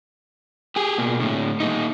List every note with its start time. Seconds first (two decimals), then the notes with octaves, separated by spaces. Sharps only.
0.76 G4 G#4
0.98 B2 A#3
1.20 A2 D3
1.60 A#2 D#4